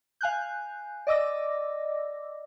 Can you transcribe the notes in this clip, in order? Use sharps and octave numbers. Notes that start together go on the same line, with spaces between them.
F5 G#5 F#6 G6
D5 D#5 D6 E6 A#6